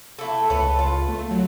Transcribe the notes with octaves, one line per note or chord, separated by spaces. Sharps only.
A3 E4 A4
C#2 A4 B4 C#5
F4
A3
F#3